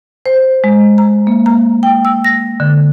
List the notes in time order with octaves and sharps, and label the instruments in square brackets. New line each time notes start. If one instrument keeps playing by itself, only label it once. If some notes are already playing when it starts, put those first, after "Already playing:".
[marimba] C5
G#3
A#5
A#3
A#5
G5
E6
A#6
D3